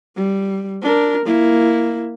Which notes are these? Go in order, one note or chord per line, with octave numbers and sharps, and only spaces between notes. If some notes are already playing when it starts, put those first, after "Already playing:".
G3
D4 A#4
A#3 E4